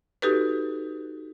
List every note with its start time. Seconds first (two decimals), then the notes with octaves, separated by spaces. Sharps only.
0.22 D#4 F#4 G4 A4 B4